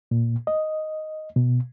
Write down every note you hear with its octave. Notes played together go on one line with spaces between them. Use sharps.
A#2
D#5
B2